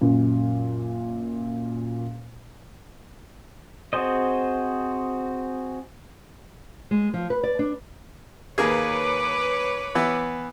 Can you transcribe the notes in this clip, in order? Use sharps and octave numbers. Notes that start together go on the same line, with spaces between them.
F#2 A#2
C4 F#4 G#4 C5 D#5
G#3
F3
B4
D5
D4
D#2 A#3 G#4 B4 C#5 D6
E3 B3 E4